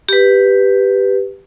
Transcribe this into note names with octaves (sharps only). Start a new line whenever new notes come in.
G4 B4